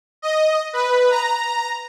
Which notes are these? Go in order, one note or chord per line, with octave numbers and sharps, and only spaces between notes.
D#5
B4
A#5